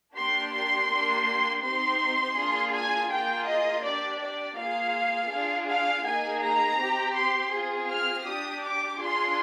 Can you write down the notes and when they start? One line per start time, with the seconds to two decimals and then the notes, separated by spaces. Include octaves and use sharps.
0.16 A#3 D4 G4 C6
0.53 C6
0.89 A#3 D4 G4
1.63 C4 D#4 G4 C6
2.36 A#3 D4 F4 G#4
2.73 G#5
3.11 A#3 F4 G#4 G5
3.47 D#5
3.83 D4 G4 D5
4.21 D5
4.57 A#3 F4 G#4 F5
5.31 D4 F4 G#4
5.68 F5
6.05 A#3 D#4 G#4 G#5
6.41 A#5
6.78 C4 G4
7.16 C6
7.52 C4 F4 G#4
7.89 F6
8.25 D4 G4 D#6
8.61 D6
8.98 D4 F4 G#4 C6